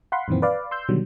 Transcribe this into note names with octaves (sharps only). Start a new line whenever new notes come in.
F5 F#5 B5 C6
F#2 A#2 D#3 E3 C4
B4 D5 F5
C6 E6 G6
B2 D3 D#3 F#3 G3